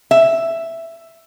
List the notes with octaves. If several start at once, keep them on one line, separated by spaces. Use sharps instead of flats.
E5